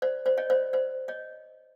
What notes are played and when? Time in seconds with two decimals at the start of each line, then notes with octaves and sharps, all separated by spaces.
0.02 C5 D5
0.26 C5 D5
0.38 C#5 D#5
0.50 C5 D5
0.73 C5 D5
1.08 C#5 D#5